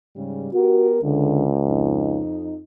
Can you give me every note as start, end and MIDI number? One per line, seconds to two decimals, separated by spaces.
0.16 0.49 44
0.16 0.49 49
0.16 0.49 55
0.54 0.99 59
0.54 0.89 66
0.54 0.99 67
0.54 0.99 70
1.03 2.22 37
1.03 1.45 50
1.67 2.60 41
1.67 2.60 63